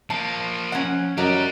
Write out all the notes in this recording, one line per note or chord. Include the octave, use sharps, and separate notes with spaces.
F3 A#3 A5
C#4 F#5
F#2 F#4 G4 A#4 D5 D#5